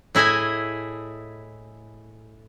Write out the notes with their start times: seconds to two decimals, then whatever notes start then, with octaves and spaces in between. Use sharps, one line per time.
0.15 A2 E4 G#4 D#5 G#5